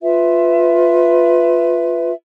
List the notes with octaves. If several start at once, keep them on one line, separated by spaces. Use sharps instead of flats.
F4 B4 E5